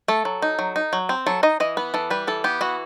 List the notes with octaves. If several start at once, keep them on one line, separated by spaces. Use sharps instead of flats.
A3 A4
F#3
D#4
F#3
D#4
F#3
C4
F#3 A4
D#4 D#5
E3 D#5
B3 B4
E3 A4
G3 B4
E3 A4
B3 G4
E3 F#4